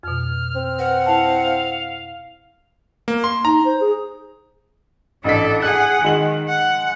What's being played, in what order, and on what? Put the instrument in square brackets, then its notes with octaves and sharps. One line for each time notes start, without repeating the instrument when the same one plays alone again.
[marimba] F2 B2 [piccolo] F6
[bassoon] C4
[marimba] B4 [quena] F#5
[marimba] E4 A5 [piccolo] F5
[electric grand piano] A#3
C6
[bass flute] D#4 [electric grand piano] A#5
[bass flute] C5
G#4
[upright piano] A1 D#5 B6 [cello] D4 A4
[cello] G#4 F#5 [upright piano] F#6
[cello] D#3 [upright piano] G#3 F#7
[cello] F#5